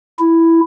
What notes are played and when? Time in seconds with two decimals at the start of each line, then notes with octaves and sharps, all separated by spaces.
0.19 E4